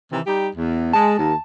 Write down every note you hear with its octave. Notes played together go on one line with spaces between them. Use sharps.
C3 D#3 E3
G3 D#4 G4
E2
G#3 A5
D#2